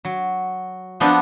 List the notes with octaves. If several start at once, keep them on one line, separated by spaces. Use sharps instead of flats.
F#3
F3 B3 C4 D4 A4